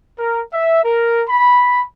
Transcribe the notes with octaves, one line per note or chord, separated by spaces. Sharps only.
A#4
E5
A#4
B5